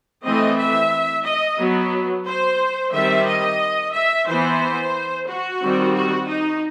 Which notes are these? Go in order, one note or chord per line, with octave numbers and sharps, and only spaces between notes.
E3 A3 C4 D#5
E5
D#5
F#3 B3
C5
D#3 G3 C4 E5
D#5
E5
E3 B3 C5
F#4
D#3 G3 C4
F#4
D#4